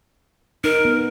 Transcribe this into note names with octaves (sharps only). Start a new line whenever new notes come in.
D#4 A#4
B3